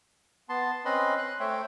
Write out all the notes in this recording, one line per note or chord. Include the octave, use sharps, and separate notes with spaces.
B3 A5 C6
C4 C#4 B4 D#5 B5 C6
F#6
A3 C5 C#5 E5 G5